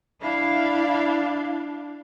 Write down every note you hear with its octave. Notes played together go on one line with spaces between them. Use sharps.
D4 E4 F5